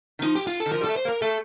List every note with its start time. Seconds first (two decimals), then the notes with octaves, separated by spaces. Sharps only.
0.19 D#3
0.22 F3 D#4
0.36 G4
0.47 F4
0.60 A4
0.66 D#3
0.72 F3 A#4
0.81 G3
0.84 A3 A4
0.96 C5
1.05 A#3
1.09 A#4
1.22 A3 A4